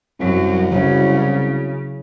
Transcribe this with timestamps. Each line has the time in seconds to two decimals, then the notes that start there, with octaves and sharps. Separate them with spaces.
0.20 C2 F#2 F#3
0.72 C#3 F#3 E4 C#5